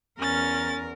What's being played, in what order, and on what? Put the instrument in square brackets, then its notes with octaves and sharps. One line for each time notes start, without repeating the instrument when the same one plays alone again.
[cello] E2 A#4 [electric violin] C#4 A6